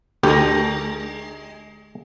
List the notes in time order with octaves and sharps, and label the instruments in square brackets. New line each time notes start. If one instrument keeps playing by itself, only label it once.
[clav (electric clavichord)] D2 G4 [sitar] G#3 D4 A#4